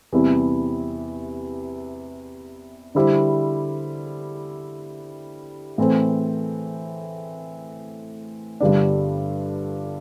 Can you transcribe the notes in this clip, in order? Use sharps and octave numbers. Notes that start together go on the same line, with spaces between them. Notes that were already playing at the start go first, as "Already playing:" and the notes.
E2 C3 G3 E4
D3 G3 E4 C5 E5
A2 E3 C4 A4 C5
G1 G2 D3 G3 D4